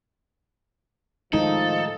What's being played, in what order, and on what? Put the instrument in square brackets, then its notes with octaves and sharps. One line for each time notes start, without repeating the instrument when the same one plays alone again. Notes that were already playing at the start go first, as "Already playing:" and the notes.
[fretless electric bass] A2 D#3 G#3 [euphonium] F3 [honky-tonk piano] D#4 [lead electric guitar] A4